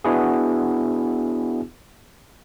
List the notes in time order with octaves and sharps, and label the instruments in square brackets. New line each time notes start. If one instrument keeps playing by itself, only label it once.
[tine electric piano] B3 D4 E4 F#4 G#4